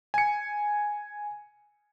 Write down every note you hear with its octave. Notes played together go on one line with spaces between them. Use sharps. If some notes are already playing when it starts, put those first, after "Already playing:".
G#5 C#7